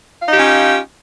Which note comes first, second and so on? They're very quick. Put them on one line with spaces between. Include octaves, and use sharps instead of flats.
F5 D#4 G4 F4 C#4